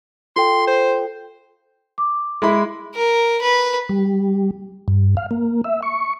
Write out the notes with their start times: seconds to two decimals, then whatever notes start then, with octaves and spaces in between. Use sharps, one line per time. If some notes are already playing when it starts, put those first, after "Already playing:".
0.36 F4 A4 G5 C6
0.67 C5
1.98 D6
2.42 G#3 E4 B5
2.95 A#4
3.42 B4
3.89 G3
4.88 G2
5.17 F5
5.31 A#3
5.64 E5
5.82 C#6